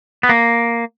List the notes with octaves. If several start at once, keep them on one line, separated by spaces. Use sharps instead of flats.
B3
A#3